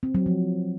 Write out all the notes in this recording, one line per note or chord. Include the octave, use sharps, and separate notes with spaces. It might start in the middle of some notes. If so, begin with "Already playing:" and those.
C4
F#3
F3